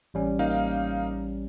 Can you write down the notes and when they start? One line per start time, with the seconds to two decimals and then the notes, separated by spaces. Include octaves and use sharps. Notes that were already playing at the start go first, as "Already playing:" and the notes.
0.14 A1 G3 C#4
0.39 A#3 D#4 F5